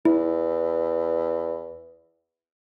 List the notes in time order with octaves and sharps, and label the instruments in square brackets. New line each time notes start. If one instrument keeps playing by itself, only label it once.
[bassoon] E2 [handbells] E4